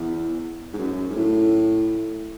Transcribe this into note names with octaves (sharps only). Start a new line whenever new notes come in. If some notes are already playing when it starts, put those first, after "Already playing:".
Already playing: E2
G#2
F#2
G#2
A2